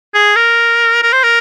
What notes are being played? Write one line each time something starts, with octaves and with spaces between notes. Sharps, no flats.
G#4
A#4
A#4
C5
A#4